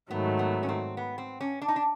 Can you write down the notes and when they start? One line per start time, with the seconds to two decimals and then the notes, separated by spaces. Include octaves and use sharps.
0.11 G#2 D#3 F#3 A3 B3
0.39 B3
0.63 C#4
0.69 C4
0.97 B3
1.18 C4
1.41 C#4
1.62 D4
1.68 D#4
1.76 D4